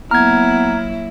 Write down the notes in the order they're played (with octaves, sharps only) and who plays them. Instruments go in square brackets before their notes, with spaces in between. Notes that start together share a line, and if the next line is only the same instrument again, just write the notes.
[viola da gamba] F#3 A#3 E4 [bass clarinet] B3 [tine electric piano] A#5 [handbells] F6 G#6